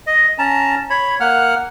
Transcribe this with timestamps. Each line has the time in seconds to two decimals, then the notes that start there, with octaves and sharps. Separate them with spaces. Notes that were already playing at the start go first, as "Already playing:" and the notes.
0.07 D#5
0.38 C#4 A5 A#5
0.90 C#5 B5
1.20 A#3 F#5 F6